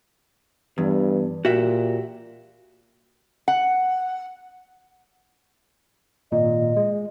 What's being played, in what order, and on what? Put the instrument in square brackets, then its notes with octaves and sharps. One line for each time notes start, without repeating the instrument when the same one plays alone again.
[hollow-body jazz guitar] E2 [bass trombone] G2
[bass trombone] A#2 [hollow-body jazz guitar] F#4 G4 E5
[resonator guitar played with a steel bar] F#5
[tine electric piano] G#1 A#2 [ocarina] D#5
[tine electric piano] G#3